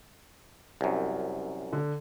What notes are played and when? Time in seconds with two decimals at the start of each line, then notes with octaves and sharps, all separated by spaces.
0.81 C2 F#2
1.73 D3